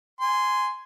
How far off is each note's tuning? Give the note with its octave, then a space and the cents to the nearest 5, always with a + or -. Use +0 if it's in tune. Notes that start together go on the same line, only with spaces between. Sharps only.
G#5 +0 C6 -10